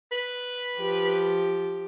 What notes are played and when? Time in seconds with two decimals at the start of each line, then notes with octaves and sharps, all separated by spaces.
0.12 B4
0.79 F3 G4